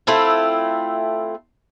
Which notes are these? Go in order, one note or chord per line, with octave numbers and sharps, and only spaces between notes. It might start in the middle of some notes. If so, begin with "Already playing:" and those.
A3 C4 E4 F4